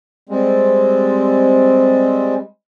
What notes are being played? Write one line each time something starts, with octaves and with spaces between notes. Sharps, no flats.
G3 G#3 C4